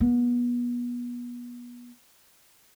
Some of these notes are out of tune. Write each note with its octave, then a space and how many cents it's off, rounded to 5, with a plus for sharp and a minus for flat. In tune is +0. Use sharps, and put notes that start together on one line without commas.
B3 -30